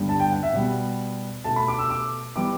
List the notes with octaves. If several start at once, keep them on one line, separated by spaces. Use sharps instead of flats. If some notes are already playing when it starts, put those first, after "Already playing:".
Already playing: G2 D3 G3 B3
A5
G5
F#5
E5
B2 G3 B3 F#5
B2 A3 A5
B5
D6
E6
D6
E3 G3 B3 D6